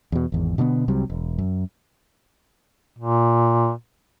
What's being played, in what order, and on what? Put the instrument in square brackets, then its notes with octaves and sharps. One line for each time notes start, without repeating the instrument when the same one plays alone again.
[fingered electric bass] E2 B2
G#1 E2
B2 D3 F3 B3
C2 C3 F#3 G3
E1
F#2
[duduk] A#2